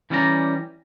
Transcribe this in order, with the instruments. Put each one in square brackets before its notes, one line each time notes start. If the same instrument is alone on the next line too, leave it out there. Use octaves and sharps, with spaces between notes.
[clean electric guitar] E3 G3 C#4 D5 F5 A#5